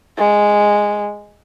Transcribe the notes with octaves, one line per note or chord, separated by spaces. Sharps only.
G#3